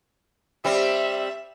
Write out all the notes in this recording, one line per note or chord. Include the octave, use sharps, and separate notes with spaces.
G3 C4 E5